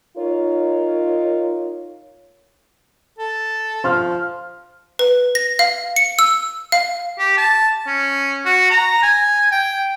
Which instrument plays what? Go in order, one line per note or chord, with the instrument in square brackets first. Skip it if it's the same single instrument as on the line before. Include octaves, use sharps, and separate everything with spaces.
[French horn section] D#4 F4 A#4 C#5
[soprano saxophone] A4
[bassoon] F3 [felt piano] C6 F6
[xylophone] B4
A#6
F5
C#7
E6
F5
[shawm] G4
A5
C#4
F#4
A#5
G#5
G5